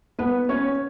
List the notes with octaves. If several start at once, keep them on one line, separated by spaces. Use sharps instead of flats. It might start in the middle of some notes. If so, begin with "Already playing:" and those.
B3 B4
C#4 C#5